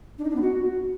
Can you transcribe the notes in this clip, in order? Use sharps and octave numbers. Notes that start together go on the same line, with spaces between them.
D4
D#4
D4
B3
F#4